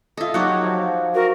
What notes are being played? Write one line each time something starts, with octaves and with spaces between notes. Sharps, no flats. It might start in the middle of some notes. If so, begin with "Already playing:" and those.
F4 A4 D#5 E5
F#3 D#4 F#4 G4 F#5 D6
F3
F#4 A#4